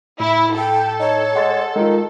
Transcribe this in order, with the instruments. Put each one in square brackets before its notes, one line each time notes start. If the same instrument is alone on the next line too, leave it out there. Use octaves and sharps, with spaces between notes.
[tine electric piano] A2 [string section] E4
[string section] A4 [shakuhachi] G5
[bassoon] D#4 [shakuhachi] C#5
[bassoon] G#3 [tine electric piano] F#5 C6 A6
[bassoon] D#3 [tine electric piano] G#3 F4